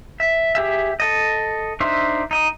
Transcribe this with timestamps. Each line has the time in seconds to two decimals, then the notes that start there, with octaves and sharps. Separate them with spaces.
0.20 E5
0.55 G4 G#4 E5
1.00 A4 D#5
1.80 D4 D#4 C5 E5
2.31 D#4 D#5